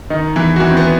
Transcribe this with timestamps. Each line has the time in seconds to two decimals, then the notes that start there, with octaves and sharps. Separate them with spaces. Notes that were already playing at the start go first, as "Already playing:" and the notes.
0.10 D#3 D#4
0.36 E2 E3 E4
0.56 F#4
0.59 D#3 E3 E4
0.70 C4
0.77 B3